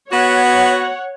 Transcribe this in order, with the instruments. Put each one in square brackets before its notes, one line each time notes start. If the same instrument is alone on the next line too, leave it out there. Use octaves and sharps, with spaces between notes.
[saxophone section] B3 F#4 [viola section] C#5 F#5